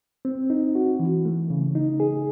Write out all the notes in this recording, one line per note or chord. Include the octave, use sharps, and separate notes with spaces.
C4
D#4
F#4
E3
A3
C#3
D#4
G#4